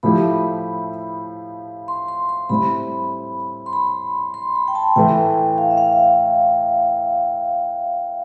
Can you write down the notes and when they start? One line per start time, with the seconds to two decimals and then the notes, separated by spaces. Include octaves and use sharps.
0.03 A2 F3 A3 E4 G4 B5
1.88 C6
2.08 C6
2.29 C6
2.49 A2 G3 C4 B5
3.66 C6
3.73 B5
4.34 C6
4.56 B5
4.68 G5
4.75 A5
4.96 A2 E3 A3 G5
5.58 F5
5.70 E5
5.78 F5
5.93 F5